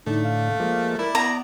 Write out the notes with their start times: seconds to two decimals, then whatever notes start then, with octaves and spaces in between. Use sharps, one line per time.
0.07 A2 D3 A3 D#4
0.24 F5
0.60 F3 G#3 A#3
0.99 E4 A#4 D5
1.15 B3 A#5